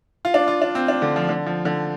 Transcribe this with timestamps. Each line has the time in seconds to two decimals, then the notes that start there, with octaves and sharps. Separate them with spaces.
0.25 F4
0.34 D4
0.48 F4
0.62 D4
0.75 C4
0.88 D4
1.02 D3
1.16 F3
1.29 D3
1.46 F3
1.65 D3